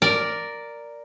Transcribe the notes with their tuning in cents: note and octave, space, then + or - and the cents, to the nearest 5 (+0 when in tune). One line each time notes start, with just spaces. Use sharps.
A#4 +0 D5 +0